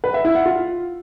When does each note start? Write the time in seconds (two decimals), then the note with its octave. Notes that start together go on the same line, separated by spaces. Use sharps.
0.04 B4
0.14 E5
0.25 E4
0.35 F#5
0.46 F4